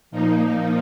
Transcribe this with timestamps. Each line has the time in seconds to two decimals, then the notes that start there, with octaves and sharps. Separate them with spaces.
0.11 A#2 F3 A#3 D#4